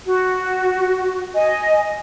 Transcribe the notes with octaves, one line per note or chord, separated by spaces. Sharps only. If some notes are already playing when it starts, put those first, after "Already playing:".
F#4
D#5 G#5